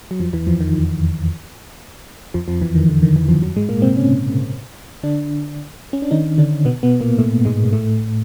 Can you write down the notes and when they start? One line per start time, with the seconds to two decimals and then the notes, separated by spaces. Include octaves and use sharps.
0.11 F#3
0.20 F2 F3
0.33 E2 E3
0.47 F2 F3
0.61 D#3
2.34 F2 F3
2.48 F2 F3
2.61 E2 E3
2.75 D#3
2.89 D3
3.03 D#3
3.16 E2 E3
3.28 F2 F3
3.42 F#2 F#3
3.56 G#2 G#3
3.69 A#2 A#3
3.82 C3 C4
3.96 C#3 C#4
5.03 D3 D4
5.93 C#4
6.02 D4
6.11 D#3 D#4
6.38 D3 D4
6.65 B2 B3
6.83 B2 B3
7.01 A#2 A#3
7.18 A2 A3
7.45 G#2 G#3
7.73 A2 A3